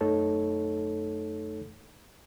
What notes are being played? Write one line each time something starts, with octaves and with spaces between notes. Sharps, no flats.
F#2 A3 D#4 A4 C#5